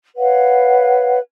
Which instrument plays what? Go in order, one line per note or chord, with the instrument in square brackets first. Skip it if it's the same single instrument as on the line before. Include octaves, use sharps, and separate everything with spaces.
[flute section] B4 C#5 F5 F#5